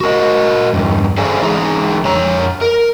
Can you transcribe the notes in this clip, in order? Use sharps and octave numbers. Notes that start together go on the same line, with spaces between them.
F#4 A#4 D#5
E2 G2
G#4 A4 C5 D5 F5 G#5
E3 D#4 G#4 A#5
F2 C#5 A#5
A#4